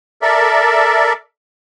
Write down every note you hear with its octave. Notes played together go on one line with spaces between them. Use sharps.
A4 A#4 D5 E5